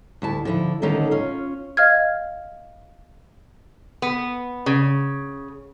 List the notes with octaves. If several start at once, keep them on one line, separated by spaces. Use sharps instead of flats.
D2 E4 A5
D3 F3 E4
D3 D#3 A3 C#4 D#4 A4
C#4 F4
D#5 F5 F6 G#6
B3
C#3